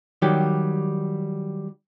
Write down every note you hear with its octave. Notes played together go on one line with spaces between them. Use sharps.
D#3 F#3 G3 G4